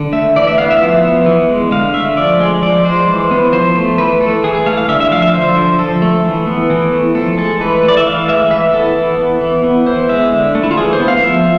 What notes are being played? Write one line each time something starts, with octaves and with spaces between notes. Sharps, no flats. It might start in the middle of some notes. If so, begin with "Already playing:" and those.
Already playing: D3
A3 E5
E3 D5
E5
B3 F5
E5
F3
B3
E3
G#3
D3 F5
A3 E5
F3 D5
G#3
F3 D5
G#3 C5
E3
B3
F3 C5
A3
E3 B4
A3 A4
E3 G#4
G#4
A3 F5
F5
D3 E5
E5
F3 F5
E5
D3 C5
F3
F3 A4
A3
E3
B3
E3
A3
F3 A4
G#3 A4
E3 B4
A3
D5
E5
E3 F5
G#3 E5
E3 E5
B3 A4
E3
B3
E3
B3
E3 C5
G#3 E5
D3
A3
E4
F4
E3 G#4
C5
B3
F5
F3 E5